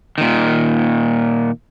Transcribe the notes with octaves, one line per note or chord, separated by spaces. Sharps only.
A#2 D#3